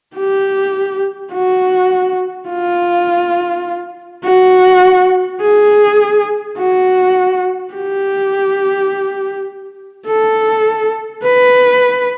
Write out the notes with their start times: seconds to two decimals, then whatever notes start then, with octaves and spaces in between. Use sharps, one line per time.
0.16 G4
1.33 F#4
2.49 F4
4.25 F#4
5.41 G#4
6.58 F#4
7.74 G4
10.07 A4
11.23 B4